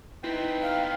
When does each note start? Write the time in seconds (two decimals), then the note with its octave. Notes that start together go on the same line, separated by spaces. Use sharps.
0.24 B3 C4 D#4 E4 B4 G5
0.62 F5